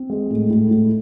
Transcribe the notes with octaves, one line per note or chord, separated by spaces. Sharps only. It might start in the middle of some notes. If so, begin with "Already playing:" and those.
Already playing: C4
G#3
A2
A2
A2